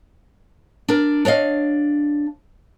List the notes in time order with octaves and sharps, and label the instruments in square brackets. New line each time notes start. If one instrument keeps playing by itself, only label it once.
[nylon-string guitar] D4 A#4
D4 C#5 D#5 F5